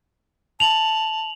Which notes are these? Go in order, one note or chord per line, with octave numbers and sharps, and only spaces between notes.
A5 F7 F#7